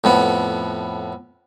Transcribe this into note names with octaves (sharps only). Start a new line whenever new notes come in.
F2 A2 B3